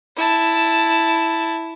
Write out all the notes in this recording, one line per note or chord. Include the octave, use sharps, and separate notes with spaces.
E4 A5